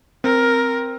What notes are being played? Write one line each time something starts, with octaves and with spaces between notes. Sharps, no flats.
C4 A#4